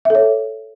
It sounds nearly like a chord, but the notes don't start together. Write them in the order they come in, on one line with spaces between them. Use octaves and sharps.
E5 A4 C#5